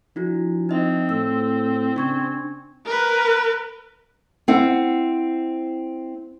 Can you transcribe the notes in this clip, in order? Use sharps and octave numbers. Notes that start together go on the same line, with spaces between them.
F3 D4 E4 F#4
C4 D#4 D#5 E5
A2 E6
C#3 D4 C#6 G#6
A#4 B4
C4 E4 F#5